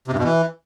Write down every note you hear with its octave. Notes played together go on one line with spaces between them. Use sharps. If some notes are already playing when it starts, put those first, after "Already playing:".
C3
G2
B2
E3